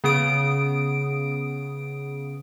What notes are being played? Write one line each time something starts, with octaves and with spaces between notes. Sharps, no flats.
C#3 B3 D#6 D7